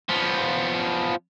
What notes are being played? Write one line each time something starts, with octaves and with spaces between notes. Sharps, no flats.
F3 B3